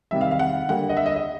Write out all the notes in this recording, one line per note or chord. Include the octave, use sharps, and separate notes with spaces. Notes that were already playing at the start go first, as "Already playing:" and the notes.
C3 D#3 G3 E5
F5
F5
F#5
D3 G3 A#3 F#5
D#5
E5
D#5
D#5